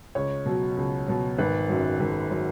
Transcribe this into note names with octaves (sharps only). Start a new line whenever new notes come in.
C#2 C#5
B2 F#3
C#2
B2 F#3
G#1 B4
F#2 F#3
G#1
F#3